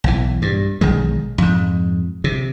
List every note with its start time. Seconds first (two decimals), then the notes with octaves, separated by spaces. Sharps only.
0.04 B1 E3
0.42 G2
0.81 B1 D#3 G#3
1.38 F2 G#2
2.24 C3